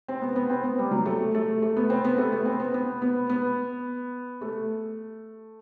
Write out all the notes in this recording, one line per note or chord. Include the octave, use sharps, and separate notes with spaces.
C4
B3
B3
C4
B3
G3
F#3
A3
A3
A3
B3
C4
B3
A3
B3
C4
B3
B3
B3
B3
A3